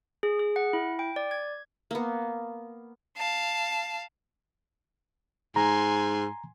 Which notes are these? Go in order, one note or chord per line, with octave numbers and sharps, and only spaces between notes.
G#4
G#4
F#5
E4
G5
D5
G#6
A#3 B3
F5 A5
G#2 G#5 A#5 C6